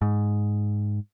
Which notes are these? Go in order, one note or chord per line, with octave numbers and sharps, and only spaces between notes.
G#2